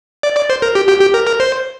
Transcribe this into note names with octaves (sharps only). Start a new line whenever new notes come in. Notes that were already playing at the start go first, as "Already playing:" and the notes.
D5
D5
C5
A#4
G4
G4
G4
A#4
A#4
C5